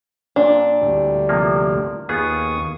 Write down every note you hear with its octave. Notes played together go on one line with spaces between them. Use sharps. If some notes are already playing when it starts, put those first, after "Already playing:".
A#2 D4
D2 A2 G3
C3 F3 A#3
D#2 B3 F4 G#4 C#6 D#6